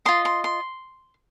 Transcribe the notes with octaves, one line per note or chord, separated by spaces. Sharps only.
F4 D#5 C6
C6
C6